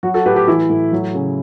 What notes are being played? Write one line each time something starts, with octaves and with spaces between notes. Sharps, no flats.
F#3 F#4
F#4 A4
A2 G4 B4
G4 B4
E3 E4
A2
F#3
C#3